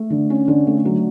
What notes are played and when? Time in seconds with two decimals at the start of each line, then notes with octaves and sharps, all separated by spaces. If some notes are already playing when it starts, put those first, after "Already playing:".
Already playing: A3
0.10 D3
0.30 C#4
0.48 D3
0.67 A3
0.85 F#3